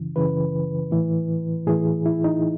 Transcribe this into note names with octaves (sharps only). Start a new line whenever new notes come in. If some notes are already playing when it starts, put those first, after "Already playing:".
Already playing: F#2 C#3 E3
F#2 C#3 E3 B4
A2 E3
A2 E3 G#4
E4
D#4